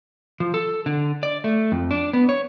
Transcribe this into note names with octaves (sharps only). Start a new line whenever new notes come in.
F3
A4
D3
D5
A3
F2
D4
B3
C#5